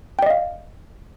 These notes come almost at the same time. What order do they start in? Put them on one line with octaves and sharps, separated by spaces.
G5 D5 D#5 F5